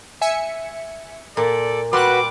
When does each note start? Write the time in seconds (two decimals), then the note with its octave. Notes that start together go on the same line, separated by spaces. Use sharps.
0.21 E5 G#5 C#7
1.37 A#2 A4 D5
1.93 G3 F#4 B4 C6 D6 F#6